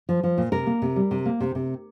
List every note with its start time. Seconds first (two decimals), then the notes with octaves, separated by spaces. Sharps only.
0.09 F3
0.23 F3
0.38 A#2
0.52 C3 A#4
0.66 A#3
0.82 C3
0.96 G3
1.11 C3
1.26 A#3
1.41 C3
1.55 C3